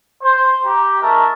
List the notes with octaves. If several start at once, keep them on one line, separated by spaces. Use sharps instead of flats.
C5
G4 A#5
G#3 D#4 A#4 C#5 E5 A5